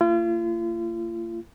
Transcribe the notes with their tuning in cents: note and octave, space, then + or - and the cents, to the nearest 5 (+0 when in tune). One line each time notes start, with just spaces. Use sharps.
A#3 -45 F4 -40